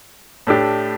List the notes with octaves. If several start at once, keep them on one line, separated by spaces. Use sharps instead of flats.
A2 A3 D4 G4